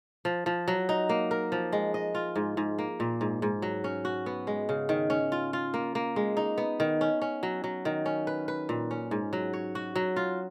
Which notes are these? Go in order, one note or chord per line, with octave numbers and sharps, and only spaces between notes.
F3
F3
F#3
D#4
A#3
A#4
F3
G#3
D#5
F4
G#2
G#2
A#3
A#2
G#2
G#2
F#3
C#4
F#4
B3
G#3
C#3
D#3
C#4
F4
F4
A#3
A#3
G#3
D#4
B3
D#3
C#4
C#4
F#3
F#3
D#3
C#4
B4
B4
A#2
C#4
G#2
F#3
C#5
F#4
F#3
F4